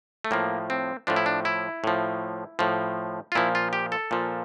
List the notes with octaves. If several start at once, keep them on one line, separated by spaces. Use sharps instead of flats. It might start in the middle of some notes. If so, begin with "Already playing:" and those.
A3
A2 F3 A#3
C4
A2 F3 D4
E4
D4
E4
A2 F3
A2 F3
F4
A#2 F3 E4
F4
G4
A4
A#2 F3